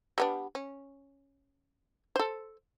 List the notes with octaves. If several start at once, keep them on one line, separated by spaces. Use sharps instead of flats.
G3 B3 D4
C#4
A4 C5